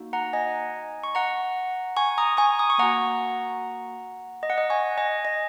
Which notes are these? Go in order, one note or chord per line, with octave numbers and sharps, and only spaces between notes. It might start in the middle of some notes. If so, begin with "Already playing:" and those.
Already playing: A#3 D#4 F#4
F#5 A#5
D#5 G#5
C#6
F#5 A#5
G#5 C#6
A#5 D#6
G#5 C#6
D#6
C#6
A#3 F#4 F#5 A#5
D#5
F#5
D#5
G#5 C#6
D#5 G#5
D#5